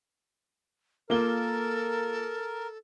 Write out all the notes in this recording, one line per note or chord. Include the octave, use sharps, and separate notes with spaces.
A#3 F4 A4 A#4 G7